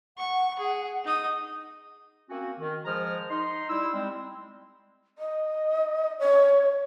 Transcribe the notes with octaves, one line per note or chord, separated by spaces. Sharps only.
F#5 C#6
G#4
D#4 D#6
A#3 C4 C#4 F#4
D#3
G#2 F3 G#3 G#4 A#5 F6
D#4 C6
G3 E4 E6
G3 G#3 C4
D#5
C#5